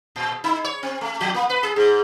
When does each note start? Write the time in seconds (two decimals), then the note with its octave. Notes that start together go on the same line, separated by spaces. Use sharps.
0.16 A#2
0.44 D#4
0.64 C#5
0.83 C4
1.01 A3
1.21 F3
1.35 A#3
1.49 B4
1.63 G#4
1.76 G#2